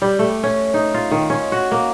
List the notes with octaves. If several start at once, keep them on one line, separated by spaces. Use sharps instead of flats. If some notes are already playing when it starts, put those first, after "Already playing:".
G3
A3
C#4
D#4
F4
D#3
C#4
F#4
A#3